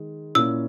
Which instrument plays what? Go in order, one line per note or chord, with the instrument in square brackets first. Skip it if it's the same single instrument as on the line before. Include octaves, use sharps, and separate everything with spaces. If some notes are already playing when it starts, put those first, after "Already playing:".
Already playing: [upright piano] D#3 G#3
[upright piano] A#2 A#3 C#4 E4 [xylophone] E6